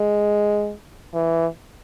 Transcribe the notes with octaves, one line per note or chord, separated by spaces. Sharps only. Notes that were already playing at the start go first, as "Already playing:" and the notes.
Already playing: G#3
E3